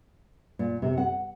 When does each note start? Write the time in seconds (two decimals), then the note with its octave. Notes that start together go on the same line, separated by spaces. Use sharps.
0.59 A#2
0.82 C3
0.97 F#5